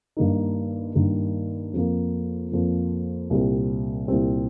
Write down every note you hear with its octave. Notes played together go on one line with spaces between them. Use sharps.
G2 D#3 A#3 D#4
G2 D#3 A#3 D#4
F2 F3 A#3
F2 F3 A#3
C2 A#2 G3 C4
C2 A#2 G3 C4